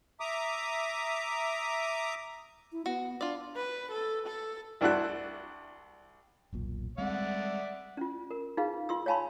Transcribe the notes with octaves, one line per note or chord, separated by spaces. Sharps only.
E5 A#5 D6 D#6
E4
B3 F#4
D4 F4 D5
B4
A4
A4
C2 D4 E4 F#4 F#6
E1 B1 A#2
G3 G#3 C4 D5 E5 F#5
C#4 F4
A#4
D#4 F4 G#4 B4 F5
F4 C6 E6
C#5 F5 G#5 A5 B5 C6